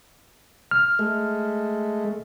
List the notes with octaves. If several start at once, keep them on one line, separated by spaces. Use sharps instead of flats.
F6
G#3 A3